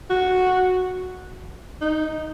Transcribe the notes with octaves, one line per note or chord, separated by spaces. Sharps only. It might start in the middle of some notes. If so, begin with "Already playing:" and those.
F#4
D#4